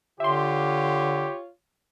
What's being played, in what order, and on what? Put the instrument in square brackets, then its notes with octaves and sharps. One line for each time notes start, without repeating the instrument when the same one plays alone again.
[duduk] D3 [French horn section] F4 C#5 [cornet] G4 [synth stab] E5 C6